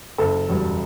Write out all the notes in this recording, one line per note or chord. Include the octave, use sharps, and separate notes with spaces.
F#1 A4
E2 B2 G3